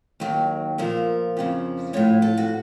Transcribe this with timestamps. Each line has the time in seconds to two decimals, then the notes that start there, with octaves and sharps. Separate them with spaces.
0.20 D#2 D#3 F#3
0.78 A#2 F3 A#4
1.37 F2 C#3 F3
1.93 A2 F3 C#5
2.22 A4
2.37 F#4